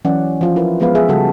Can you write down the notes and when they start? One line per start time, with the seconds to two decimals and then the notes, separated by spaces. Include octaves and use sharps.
0.05 E3 F#3 C#4 D5 F#5
0.41 F3 F4
0.56 E4 F4 A#4 B4
0.80 F3 G#3 B3 F4 B4 F5
0.95 G#4 E5
1.09 C#3 G3 F#4 A4